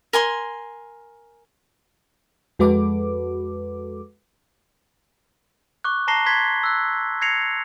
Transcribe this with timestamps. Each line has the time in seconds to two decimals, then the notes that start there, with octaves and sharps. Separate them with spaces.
0.13 A#4 G#5 C6
2.59 F2 G#3 F#4 A4 B4 D6
5.84 C#6 D6 F#6
6.08 A5 A#5 A#6 C7 G7
6.26 C6 G#6 B6 G7
6.63 E6 F#6
7.21 G#6 A#6 C7 C#7 F7